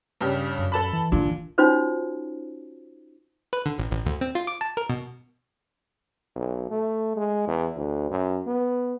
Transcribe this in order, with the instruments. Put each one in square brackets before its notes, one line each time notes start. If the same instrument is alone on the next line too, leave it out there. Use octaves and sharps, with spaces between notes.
[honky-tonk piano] G2 C#3 G4
[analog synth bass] F#2
[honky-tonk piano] A4 A5 B5
[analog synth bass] E3
[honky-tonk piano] A#2 [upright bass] D3 E3 [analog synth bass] D4
[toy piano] C#4 D#4 F4 F#4 C5 C#5
[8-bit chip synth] B4
D3
A1
A1
D2
C4
F4
D6
A5
A#4
B2
[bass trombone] B1
A3
G#3
E2
D2
F#2
B3